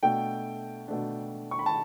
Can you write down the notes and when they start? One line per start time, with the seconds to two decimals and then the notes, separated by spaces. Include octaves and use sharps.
0.03 B2 A3 D4 G5
0.88 B2 A3 D4
1.51 C#6
1.59 B5
1.66 A5